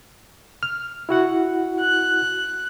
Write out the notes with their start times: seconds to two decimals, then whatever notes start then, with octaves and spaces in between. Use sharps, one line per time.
0.63 F6
1.09 E4 F#4 F#5
1.80 F#6